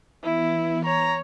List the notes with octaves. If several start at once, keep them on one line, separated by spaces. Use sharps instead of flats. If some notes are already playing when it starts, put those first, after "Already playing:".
E3 B3 E4
C#5 A#5